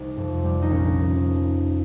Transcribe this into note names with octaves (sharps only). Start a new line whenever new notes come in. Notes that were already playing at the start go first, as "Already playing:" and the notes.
Already playing: C2 D#4
F2
G3
D#4
A#1 C#4